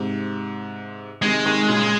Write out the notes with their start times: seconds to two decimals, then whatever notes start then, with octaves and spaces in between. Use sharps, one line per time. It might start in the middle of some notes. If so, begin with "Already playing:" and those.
Already playing: G#2 C3
1.22 C3 D#3 G#3
1.45 C3 D#3
1.69 A#2 C#3